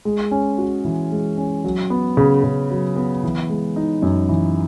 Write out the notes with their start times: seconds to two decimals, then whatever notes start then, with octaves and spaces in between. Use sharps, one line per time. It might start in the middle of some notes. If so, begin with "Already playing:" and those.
0.05 G#3
0.31 C#4
0.58 F#4
0.85 E3
1.11 G#3
1.38 C#4
1.64 F#3
1.90 B3
2.17 C#3
2.44 C#3
2.70 F#3
2.96 B3
3.23 E3
3.50 G#3
3.76 D#4
4.02 F#2
4.29 E3